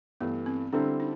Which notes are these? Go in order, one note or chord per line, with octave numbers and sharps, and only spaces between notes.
G2 E3 A3 B3
C4
D3 G3 C4 D4 E4 A4
D#4